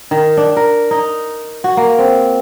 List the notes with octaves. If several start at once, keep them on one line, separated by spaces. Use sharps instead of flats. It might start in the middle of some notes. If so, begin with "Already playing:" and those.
D#3
D4
A#4
D#4
F#4
A#3
C4